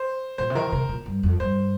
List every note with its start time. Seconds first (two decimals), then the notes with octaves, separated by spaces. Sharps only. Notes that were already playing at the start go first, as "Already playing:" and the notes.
Already playing: C5
0.38 A#2 C5
0.50 C3
0.55 D#3 A#4
0.72 C3 A#4
0.89 A#2
1.06 G2
1.23 F2
1.40 G2 C5